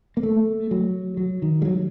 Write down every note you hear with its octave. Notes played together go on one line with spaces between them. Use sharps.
A#3
A3
F#3
F#3
D#3
G3
F#3